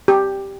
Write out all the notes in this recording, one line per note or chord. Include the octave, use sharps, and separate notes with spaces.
G4